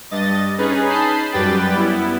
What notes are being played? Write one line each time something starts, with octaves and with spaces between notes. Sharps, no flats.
G2 D#5 A6
C#4 D#4 G#4 B4
A5 B5 D#6 G6 C7
F#2 G3 B4 G5 A6
B3 E4